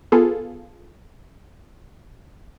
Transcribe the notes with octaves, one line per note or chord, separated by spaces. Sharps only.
B3 F4 G#4 A4